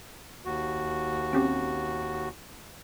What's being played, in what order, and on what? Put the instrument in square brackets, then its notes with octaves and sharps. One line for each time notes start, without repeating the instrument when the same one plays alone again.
[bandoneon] D#2 F#4
[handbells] C4 C#4 G4